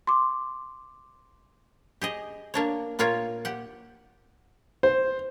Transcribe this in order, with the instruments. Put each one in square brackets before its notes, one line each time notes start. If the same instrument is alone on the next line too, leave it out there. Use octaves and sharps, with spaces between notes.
[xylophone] C6 D6
[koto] G4 G#4 D#5
A#3 D4 C#5
A#2 A#3 F4 A#4 C#5
G4 F#5
[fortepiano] C5